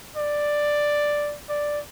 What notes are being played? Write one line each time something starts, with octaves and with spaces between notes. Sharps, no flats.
D5
D5